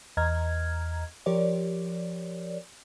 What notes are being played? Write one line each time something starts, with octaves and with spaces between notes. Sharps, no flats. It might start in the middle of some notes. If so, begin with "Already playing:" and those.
E2 D#5 A#5 F6 G#6
F3 G4 A#4 C#5 D5